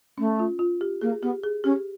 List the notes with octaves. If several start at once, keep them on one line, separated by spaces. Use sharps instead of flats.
A3 C#4
F4
F4
G4
A#3 G#4
B3 G4
G#4
C#4 G4